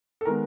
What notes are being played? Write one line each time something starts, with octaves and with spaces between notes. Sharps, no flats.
A4
D#3 G#3 B3 A#4